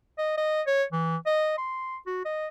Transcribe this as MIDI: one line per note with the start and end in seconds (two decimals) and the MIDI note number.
0.18 0.33 75
0.37 0.62 75
0.67 0.84 73
0.92 1.16 52
1.26 1.53 75
1.58 1.97 84
2.07 2.21 66
2.25 2.48 75